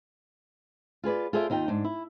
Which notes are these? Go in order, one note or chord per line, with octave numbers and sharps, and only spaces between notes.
F4 G#4 B4 D5
F4 G#4 A4 C5 D5 E5
D#2 D#4 F4 G5
G#2 D4
E4